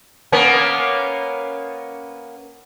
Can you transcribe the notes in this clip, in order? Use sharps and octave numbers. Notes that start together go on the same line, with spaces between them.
A#3 B3 C#4